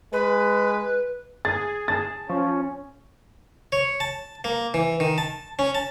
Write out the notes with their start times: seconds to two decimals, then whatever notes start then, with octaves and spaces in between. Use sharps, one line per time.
0.13 G#3 B4
1.45 G#4 A6
1.88 A5 A6
2.29 F3 C#4 C#6
3.72 C#5
4.00 A5
4.44 A#3
4.74 E3
5.00 D#3
5.18 A5
5.59 C#4
5.75 A5